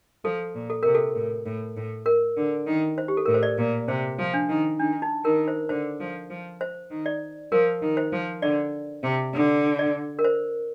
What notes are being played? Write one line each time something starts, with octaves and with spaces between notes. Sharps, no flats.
F3 A4
A#2
A4
C3 A#4
A4
A2
A2
A2
A#4
D3
D#3
C5
G4
A4
A2 A#4
C5
D5
A#2
C3 C5
F3
D4
D#3
D#3 D4
D#4
D#3 A#4
C5
D3 C5
F3
F3
C5
D#3
D5
F3 A#4
D#3
C5
F3
D3 D5
C3
D3
D5
A#4
C5